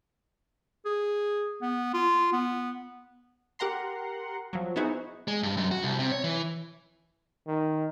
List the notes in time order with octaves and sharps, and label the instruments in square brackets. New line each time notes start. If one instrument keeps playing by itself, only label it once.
[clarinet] G#4
B3
F4
B3
[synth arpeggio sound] G4 A#4 F#5 A#5 C6
F3 F#3
B3 D#4 E4 F#4 G#4 C5
[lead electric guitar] G#3
G2
F#2
F#4
C2
C3
C#5
E3
[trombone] D#3